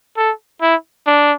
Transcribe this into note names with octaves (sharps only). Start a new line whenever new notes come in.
A4
E4
D4